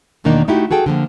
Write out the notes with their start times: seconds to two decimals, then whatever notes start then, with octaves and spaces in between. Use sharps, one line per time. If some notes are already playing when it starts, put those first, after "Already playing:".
0.24 E2 B2 D#3 A#3 D4 D#4
0.48 A3 D#4 E4 F#4 G4
0.71 F#4 G#4 A4 G5
0.86 D3 F3 A#3